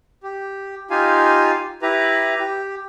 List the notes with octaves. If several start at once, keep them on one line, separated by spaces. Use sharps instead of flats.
G4
D#4 F4 G4 F5 G#5
E4 G4 B4 A#5
G4